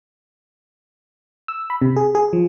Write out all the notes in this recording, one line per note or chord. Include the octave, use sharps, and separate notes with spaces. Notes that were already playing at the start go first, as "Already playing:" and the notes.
E6
B5
C3
G#4
G#4
F3